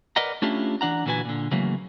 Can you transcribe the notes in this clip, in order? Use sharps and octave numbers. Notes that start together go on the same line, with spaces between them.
A#4 B4 D5 D#5 F#5 A#5
A3 C#4 D4 E4 F4 G4
E3 D4 F#5 A#5
A#2 D3 E3 F#4 B4 G#5
A#2 D3
C#3 E3 F#3 A3 A#3